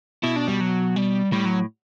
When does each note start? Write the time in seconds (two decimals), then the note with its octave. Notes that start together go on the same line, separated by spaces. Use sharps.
0.23 B2 E4
0.36 D4
0.48 G3
0.61 F#3
0.96 G3
1.32 A2 G3
1.45 F#3